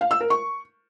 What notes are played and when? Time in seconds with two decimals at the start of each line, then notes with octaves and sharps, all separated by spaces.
0.01 F5
0.11 E6
0.21 A#4
0.30 C#6